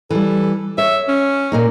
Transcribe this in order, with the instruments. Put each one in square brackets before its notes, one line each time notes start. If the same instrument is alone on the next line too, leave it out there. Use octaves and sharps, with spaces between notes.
[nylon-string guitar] E3 G3 [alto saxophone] A4
[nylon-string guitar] C#5 [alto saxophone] E5
[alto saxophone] C#4
[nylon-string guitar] A#2 A#3 D#4